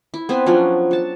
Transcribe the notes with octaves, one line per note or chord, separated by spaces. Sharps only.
E4
B3 C4 B4 C5
F3 F#3 C#4 D4
F#4 A5